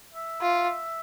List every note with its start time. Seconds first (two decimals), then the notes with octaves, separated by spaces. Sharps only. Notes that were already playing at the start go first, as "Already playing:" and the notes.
0.15 E5
0.42 F4